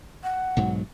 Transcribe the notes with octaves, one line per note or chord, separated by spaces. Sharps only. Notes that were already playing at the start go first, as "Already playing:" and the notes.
F#5
B1 G#2 F#3